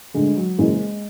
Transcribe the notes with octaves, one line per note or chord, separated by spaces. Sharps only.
D2 D3 G#3
F#3
F#1 F#2 E3 G#3